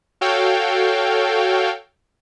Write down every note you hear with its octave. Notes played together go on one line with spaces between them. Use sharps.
F#4 A4 C#5 F5 G5